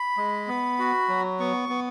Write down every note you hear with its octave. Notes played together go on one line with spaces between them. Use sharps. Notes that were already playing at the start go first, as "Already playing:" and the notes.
Already playing: B5
G#3
B3
F#4
F#3
B3 C#6
B3